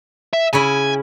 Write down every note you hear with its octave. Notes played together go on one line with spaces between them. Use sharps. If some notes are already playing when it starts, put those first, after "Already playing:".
E5
C#3 C#4 E4 G#5